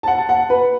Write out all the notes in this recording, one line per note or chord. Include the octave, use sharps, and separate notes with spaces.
A5
F#5
A5
F#5
B4